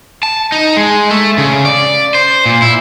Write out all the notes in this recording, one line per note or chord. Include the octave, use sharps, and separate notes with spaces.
A5
D#4
G#3
A3
C#3
D5
C5
A#2
E4